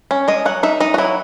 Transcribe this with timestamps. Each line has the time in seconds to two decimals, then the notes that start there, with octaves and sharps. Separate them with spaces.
0.11 C#4
0.28 G#3 D#5
0.45 F#3 F#5
0.63 D#4 E5
0.80 D#4 D#5
0.94 F#4
0.98 F#3 E4